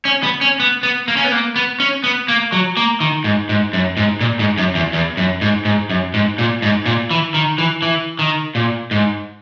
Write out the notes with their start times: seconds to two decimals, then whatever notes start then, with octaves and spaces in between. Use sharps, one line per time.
0.05 C#4
0.23 B3
0.41 C#4
0.60 B3
0.83 B3
1.08 A#3
1.17 C#4
1.24 B3
1.32 A#3
1.56 B3
1.80 C#4
2.04 B3
2.28 A#3
2.52 F#3
2.77 A#3
3.00 D#3
3.24 G#2
3.49 G#2
3.73 F#2
3.97 G#2
4.21 A#2
4.39 G#2
4.58 F#2
4.75 E2
4.93 E2
5.17 F#2
5.41 G#2
5.65 G#2
5.90 F#2
6.14 G#2
6.38 A#2
6.62 G#2
6.86 A#2
7.11 E3
7.34 D#3
7.58 E3
7.82 E3
8.19 D#3
8.55 A#2
8.91 G#2